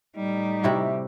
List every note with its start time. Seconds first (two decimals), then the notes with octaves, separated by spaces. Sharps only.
0.16 A2 G3 D#4
0.63 C3 E4 F#4